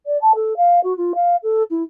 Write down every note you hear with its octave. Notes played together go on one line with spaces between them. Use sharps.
D5
A5
A4
F5
F#4
F4
F5
A4
E4